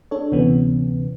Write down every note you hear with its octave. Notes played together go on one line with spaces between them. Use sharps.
D4 A4 C#5
D2 C3 E3 B3 C#4